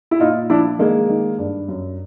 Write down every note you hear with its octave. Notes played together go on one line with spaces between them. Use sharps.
E4
A#2 D#4 F4
F3 D4 E4
D#3 G#3 A#3
D#3
G2
F#2